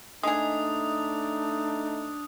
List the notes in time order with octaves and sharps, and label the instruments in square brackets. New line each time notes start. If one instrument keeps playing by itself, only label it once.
[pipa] G#3 G#4 [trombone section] A3 D#4 [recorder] D4 [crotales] D#6